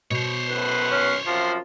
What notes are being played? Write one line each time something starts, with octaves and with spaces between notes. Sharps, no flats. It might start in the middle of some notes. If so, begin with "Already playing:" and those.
B2 C5 C#5
F#2 A2 B4
C#4
F#2 C3 F3 F4